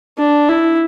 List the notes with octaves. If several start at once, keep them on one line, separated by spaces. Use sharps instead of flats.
D4
E4